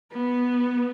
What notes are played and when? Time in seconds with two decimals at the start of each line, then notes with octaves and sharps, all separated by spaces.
0.12 B3